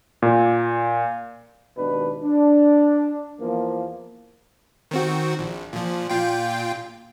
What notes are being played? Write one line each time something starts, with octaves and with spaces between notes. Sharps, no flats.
A#2
G#1 D#2 B2 D4 B4
D4
E2 F3 A#3
D#3 C4 F#4
A#1
A#2 F3
A#2 F4 G5